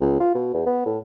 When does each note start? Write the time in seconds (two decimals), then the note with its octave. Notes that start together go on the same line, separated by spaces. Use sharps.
0.01 C#2
0.20 F4
0.35 B2
0.54 E2
0.66 B3
0.86 A2